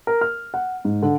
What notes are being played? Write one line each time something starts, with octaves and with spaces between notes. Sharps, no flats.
A#4
F6
F#5
G#2
D3